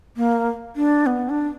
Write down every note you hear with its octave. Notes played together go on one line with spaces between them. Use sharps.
A#3
D4
B3
D4